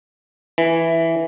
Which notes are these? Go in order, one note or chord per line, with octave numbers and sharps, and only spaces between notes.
E3